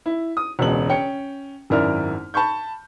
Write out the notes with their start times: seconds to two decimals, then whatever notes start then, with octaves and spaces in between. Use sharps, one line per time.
0.06 E4
0.37 D#6
0.59 E1 C#2 B2 F#7
0.89 C#4 G5 C#7
1.70 G#1 F#2 E4 A#4 D5 F6
2.34 A5 B5 C#6 G6